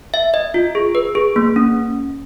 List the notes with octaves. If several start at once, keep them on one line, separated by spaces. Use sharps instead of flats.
E5
D#5
F4
G#4
B4
G#4
A#3
C#4